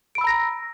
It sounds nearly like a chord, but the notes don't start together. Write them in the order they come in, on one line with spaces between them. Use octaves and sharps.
D7 B5 E6 A#5 A#6